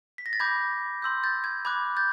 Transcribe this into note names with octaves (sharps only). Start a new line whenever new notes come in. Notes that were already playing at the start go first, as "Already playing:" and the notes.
B6
A#6
A6
B5 D6 G6 G#6
C6 E6 G6
G6 A6
G#6
B5 D6 F#6 G#6
G6 A6